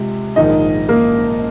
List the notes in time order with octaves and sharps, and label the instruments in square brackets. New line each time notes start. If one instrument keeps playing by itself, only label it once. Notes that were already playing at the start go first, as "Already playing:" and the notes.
Already playing: [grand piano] C3 G#3 C4 F4
[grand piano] A#1 G#2 D#3 [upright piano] D#4 D#5
[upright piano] A#3 A#4